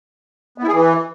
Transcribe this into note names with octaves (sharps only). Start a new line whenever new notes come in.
B3
E4
G#4
E3